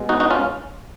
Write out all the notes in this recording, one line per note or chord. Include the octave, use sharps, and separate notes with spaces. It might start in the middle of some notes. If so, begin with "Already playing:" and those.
Already playing: B2 G#3
D#4 F#4
D#4 F#4
C#4 F4